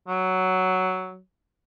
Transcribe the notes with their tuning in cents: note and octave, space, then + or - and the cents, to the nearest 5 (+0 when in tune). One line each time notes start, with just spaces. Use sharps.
F#3 +5